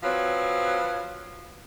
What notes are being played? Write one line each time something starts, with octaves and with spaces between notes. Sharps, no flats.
F3 F#3 C4 B4